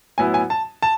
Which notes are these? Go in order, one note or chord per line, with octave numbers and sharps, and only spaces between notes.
A2 F#3 B3 E4 G#5
G#5
A5
A5